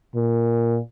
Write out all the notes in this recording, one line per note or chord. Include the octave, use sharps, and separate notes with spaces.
A#2